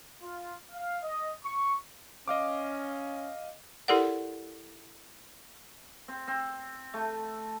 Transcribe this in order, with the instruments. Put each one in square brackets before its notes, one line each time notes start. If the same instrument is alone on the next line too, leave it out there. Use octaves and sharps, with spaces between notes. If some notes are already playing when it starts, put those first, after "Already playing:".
[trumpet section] F4
F5
D#5
C#6
[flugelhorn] C#4 [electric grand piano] D#5 F5 D6
[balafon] E4 G4 A4 A#4 D5 F#5
[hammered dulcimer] C4
C4
A3